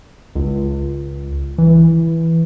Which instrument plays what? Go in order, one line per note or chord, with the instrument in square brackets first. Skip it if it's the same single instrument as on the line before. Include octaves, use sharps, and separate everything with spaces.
[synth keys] C#2
E3